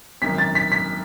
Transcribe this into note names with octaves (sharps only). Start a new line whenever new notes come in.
G#1 F#2 D#3 B6
A6
B6
B6